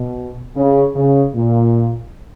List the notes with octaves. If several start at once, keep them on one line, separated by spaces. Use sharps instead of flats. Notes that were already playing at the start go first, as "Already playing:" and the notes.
Already playing: B2
C#3
C#3
A#2